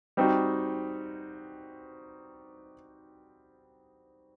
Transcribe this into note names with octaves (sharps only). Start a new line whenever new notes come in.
G3 C4 D#4 F#4